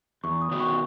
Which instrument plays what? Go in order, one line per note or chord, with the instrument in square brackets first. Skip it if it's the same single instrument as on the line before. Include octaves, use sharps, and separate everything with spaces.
[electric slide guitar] E2 [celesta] C#6
[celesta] D#6
[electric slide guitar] D#3 F#3 B3 F#4
[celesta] C#6